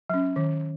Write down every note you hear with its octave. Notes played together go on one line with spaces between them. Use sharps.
F#3 C#4
D#3